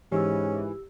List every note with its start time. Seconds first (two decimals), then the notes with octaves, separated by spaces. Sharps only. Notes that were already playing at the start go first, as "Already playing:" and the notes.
0.12 G#2 E3 C#4 G4 E6